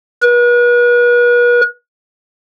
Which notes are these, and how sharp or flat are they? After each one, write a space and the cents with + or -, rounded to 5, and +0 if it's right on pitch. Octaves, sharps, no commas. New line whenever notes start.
B4 -40